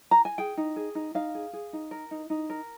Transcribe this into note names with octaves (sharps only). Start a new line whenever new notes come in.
A#5
G#5
G#4 G5
D#4
G#4
D#4
D#4 F5
G#4
G#4
D#4
A#4
D#4
D#4
A#4